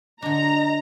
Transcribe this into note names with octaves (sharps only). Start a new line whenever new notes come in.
D3 D4 D#5 A#5